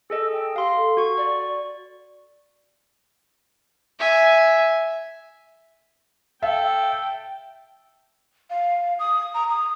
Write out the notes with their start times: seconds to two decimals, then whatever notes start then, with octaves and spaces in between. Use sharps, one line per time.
0.10 G#4 A4 D#5 E6
0.33 G5
0.56 G4 F5 C6 C7
0.77 A4
0.97 F#4 C#6
1.17 D5
3.99 E5 G#5
6.43 A4 E5 F5 G5
8.50 F5
8.99 D#6
9.34 A#5
9.49 D#6